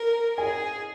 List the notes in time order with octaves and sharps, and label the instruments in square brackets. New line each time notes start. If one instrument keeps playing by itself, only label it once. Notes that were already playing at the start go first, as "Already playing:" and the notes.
Already playing: [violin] A#4
[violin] G#4 [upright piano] G#5